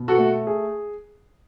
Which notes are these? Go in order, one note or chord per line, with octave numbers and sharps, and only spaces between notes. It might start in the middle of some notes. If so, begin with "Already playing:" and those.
Already playing: B2
F#4 A4
A3
G#4